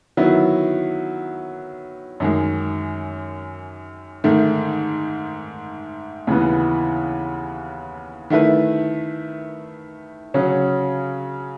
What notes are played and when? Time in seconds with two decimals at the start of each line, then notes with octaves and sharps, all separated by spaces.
0.17 D#3 F#3 B3 E4
2.20 F#2 D#3 G#3
4.24 G#2 D#3 A3
6.27 D#2 C#3 E3 B3
8.30 D#3 A3 E4 B4
10.34 C#3 F#3 C#4